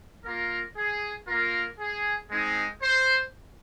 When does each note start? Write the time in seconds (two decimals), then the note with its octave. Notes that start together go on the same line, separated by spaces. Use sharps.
0.25 A#3 F4 A#4
0.77 G#4
1.28 A#3 F4 A#4
1.79 G#4
2.30 G#3 C4 D#4 G#4
2.82 C5